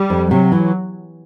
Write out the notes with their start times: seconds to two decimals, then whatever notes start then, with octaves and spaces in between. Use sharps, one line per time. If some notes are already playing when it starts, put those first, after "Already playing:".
Already playing: G3
0.10 F2
0.30 C3 F#3
0.52 E3